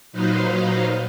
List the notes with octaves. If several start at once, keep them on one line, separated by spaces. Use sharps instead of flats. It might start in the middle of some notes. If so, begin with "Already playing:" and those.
A#2 F#3 D#4 B4 C5 F5